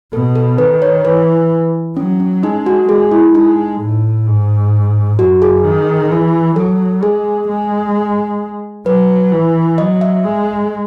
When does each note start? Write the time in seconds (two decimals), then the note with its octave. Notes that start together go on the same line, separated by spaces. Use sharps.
0.13 B2 A4
0.36 A4
0.58 D#3 B4
0.82 C#5
1.05 E3 B4
1.97 F#3 C#4
2.20 C#4
2.43 G#3 D#4
2.66 F#4
2.89 G#3 G#4
3.11 E4
3.35 G#3 D#4
3.81 A2
4.27 G#2
5.19 F#2 F#4
5.42 G#4
5.65 D#3
6.11 E3
6.56 F#3 A4
7.02 G#3 G#4
7.48 G#3
8.86 F#3 B4
9.32 E3
9.78 F#3 D#5
10.01 E5
10.24 G#3